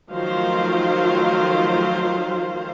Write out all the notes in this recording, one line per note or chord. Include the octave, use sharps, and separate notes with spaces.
D#3 F3 F#3 A3 C5 F5